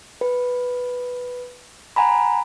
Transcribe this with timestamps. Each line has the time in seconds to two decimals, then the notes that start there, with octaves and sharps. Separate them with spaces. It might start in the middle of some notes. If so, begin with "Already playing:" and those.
0.21 B4
1.96 F#5 G#5 A#5 B5